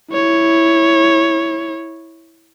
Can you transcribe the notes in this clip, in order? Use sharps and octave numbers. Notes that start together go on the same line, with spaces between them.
E4 C#5